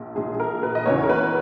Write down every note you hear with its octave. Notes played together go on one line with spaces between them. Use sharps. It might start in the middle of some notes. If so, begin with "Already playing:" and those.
Already playing: A#1 A#2 G#4
A#1 A#2 G#4
G#4
A#4
B4
D#5
F#1 E2 C#3 E3 C#5
A#4
B4